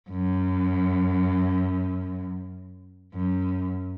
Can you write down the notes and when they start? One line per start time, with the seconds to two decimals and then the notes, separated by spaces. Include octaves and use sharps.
0.10 F#2
3.14 F#2